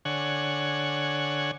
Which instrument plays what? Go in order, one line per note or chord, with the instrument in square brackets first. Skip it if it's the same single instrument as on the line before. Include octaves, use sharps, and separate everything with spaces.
[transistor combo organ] D3 C#5 F#5 G#5